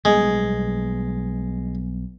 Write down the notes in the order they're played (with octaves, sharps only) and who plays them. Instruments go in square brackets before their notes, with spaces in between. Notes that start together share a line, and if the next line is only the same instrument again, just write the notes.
[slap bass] B1 G3 B3 [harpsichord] G#3